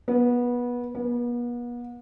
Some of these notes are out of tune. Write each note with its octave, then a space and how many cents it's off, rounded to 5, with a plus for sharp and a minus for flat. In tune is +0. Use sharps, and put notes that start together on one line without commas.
B3 -20
B3 -40